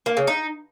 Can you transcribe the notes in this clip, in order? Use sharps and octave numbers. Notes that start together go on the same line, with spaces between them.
A#3
C#3
D#4